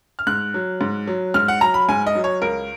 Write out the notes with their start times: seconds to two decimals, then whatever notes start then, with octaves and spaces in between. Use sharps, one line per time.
0.19 F6
0.27 G#2 F#6
0.54 F#3
0.81 G#2
1.07 F#3
1.34 G#2 F6
1.48 F#5
1.61 F#3 A#5
1.74 B5
1.89 G#2 G#5
2.07 D#5
2.15 F#3
2.24 C#5
2.42 C#2 A#4